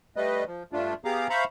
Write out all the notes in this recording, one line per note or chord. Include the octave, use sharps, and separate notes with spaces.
G3 A3 B4 D#5
F3
G2 A3 D4 F4
B3 G4 G#4 F5 A#5 D6
C5 E5 F5 A#5 B5 C#6